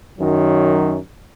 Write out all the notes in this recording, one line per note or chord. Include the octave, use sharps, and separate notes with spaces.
F#2 D#3 F#3